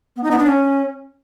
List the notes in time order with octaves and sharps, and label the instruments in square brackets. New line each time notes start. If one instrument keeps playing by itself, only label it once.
[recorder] B3
D#4
B3
D4
C#4